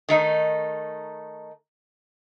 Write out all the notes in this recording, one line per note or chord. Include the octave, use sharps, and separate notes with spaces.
D#3 A3 D#4